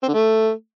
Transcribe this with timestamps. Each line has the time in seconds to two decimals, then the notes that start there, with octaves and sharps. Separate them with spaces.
0.03 C4
0.08 D3
0.14 A3